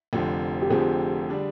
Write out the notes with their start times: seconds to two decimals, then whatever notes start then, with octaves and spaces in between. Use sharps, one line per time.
0.13 F1 F2 D3 F3 C4
0.61 G4
0.70 F1 F2 D3 F3 C4 G#4
1.29 D3 G3 D4